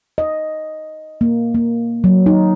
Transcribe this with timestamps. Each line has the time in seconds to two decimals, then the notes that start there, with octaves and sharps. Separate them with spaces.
0.18 D#5
1.21 A#3
1.54 A#3
2.04 F#3
2.26 D#4